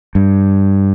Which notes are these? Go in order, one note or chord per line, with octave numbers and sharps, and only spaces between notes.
G2